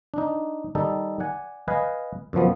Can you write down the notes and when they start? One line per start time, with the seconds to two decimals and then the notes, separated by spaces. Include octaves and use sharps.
0.14 D4 D#4
0.75 D#3 G3 D#4 A4
1.20 D5 F#5 G#5
1.68 B4 D#5 F5 G#5
2.33 F#2 B2 F3 B3